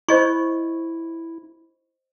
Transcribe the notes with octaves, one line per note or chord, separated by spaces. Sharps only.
E4 C5 D#5 C#6